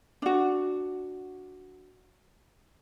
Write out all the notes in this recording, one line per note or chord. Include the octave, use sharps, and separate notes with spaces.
D4 F#4